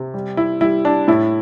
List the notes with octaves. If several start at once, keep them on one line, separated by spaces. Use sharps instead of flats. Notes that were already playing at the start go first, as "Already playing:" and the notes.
Already playing: C3
G3
E4
G3 E4
D4
A2 E4